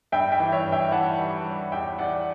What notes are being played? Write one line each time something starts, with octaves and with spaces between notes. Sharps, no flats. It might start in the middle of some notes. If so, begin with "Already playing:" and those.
G2 E5 G5
E5 G5
E3
C#5 E5
G2
E5 G5
E3 F#5 A5
G3
G3
E2 E5 G5
E2 D5 F#5